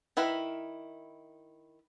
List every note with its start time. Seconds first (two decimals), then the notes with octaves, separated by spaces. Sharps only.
0.17 D#3 E4 A#4 B4